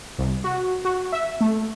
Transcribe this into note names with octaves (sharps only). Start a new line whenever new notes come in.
C2
F#4
F#4
E5
A3